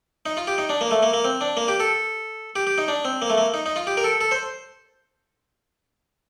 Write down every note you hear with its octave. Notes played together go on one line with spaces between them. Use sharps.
D#4
F4
G4
D#4
D4
A#3
A3
A#3
A#3
C4
D4
A#3
G4
A4
G4
G4
D#4
D4
C4
A#3
A3
A#3
D#4
D#4
F4
G4
A#4
A4
A4
C5